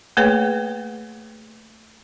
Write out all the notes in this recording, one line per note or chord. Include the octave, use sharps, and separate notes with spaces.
A3 A#3 G#4 B4 C#5 G5